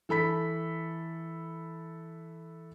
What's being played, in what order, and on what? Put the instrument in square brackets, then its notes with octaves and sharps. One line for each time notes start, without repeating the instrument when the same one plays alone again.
[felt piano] E3 A4 B5 B6